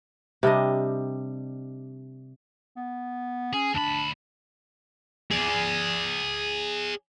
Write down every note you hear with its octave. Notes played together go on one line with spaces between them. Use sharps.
C3 G3 D4 D#5
B3
C#4 G#4
D2 D4 B5
G#4 D5